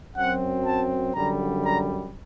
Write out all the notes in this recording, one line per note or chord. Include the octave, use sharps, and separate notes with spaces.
F#2 F#3 C4 F#5
A5
F#2 D3 G3 A#5
A#5